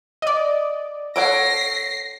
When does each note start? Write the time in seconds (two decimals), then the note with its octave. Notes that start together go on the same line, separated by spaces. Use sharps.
0.22 D5 D#5
1.16 A4 C#5 F#5 A#6 C7 D7